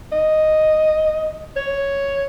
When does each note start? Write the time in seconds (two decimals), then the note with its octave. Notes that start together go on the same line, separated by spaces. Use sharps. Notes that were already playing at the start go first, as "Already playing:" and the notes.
0.12 D#5
1.56 C#5